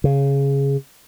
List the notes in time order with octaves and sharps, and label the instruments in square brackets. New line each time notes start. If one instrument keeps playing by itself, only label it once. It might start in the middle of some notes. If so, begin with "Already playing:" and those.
[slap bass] C#3